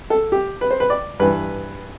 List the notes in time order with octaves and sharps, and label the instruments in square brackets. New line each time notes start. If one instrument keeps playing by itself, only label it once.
[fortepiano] A4
G4
B4
C5
B4
D5
G2 E3 B4